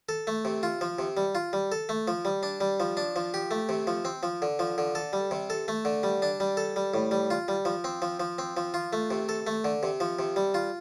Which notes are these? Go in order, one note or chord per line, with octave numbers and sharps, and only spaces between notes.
A4
A3
C3
F4
F3
C3
G3
F4
G3
A4
A3
F3
G3
D4
G3
F3
D4
F3
G4
A3
C3
F3
C4
F3
D3
F3
D3
A4
G3
C3
A4
A3
D3
G3
D4
G3
A4
G3
A2
G3
F4
G3
F3
C4
F3
F3
C4
F3
F4
A3
C3
A4
A3
D3
C3
F3
C3
G3
F4